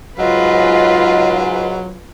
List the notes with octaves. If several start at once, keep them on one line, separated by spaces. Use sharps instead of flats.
C#2 G#2 F#3 F4 B4 D#5